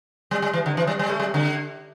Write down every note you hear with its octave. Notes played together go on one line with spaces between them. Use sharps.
G3
G3
E3
D3
E3
G3
G3
A3
G3
D3